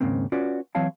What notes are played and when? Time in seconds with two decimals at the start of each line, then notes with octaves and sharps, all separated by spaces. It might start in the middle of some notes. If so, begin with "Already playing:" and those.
0.01 D#2 G#2 C#3 A#3 C4
0.32 C#4 F4 F#4 B4 D5
0.75 E3 F#3 C4 C#5 F5 A5